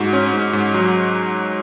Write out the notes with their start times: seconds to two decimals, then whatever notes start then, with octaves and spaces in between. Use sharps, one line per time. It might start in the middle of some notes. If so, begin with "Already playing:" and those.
Already playing: G#2 F#4
0.13 C#4
0.34 G#2
0.53 G#2
0.74 F#3